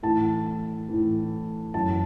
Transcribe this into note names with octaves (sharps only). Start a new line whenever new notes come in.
A2 E3 A5
A2 E3
F#2 E3 A5